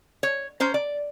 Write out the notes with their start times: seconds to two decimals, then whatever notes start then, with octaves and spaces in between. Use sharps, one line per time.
0.23 C#5
0.60 C#4 C5 A#5
0.74 D5